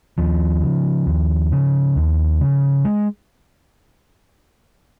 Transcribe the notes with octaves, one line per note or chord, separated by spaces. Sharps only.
D#2 F3
C#3
D#2
C#3
D#2
C#3
G#3